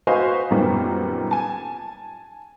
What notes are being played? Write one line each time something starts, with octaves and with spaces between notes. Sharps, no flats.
F#4 B4 C5 D#5 F5 G#5
F#2 A#2 D#3 G3 B3 C4
G#5 A5